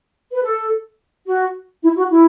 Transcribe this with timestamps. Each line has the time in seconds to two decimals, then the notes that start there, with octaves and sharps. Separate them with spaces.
0.32 B4
0.43 A4
1.27 F#4
1.83 E4
1.97 F#4
2.11 E4